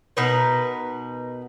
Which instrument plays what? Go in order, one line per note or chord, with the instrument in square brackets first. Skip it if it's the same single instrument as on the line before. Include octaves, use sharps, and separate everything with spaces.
[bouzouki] B2 D#4 A#4 B4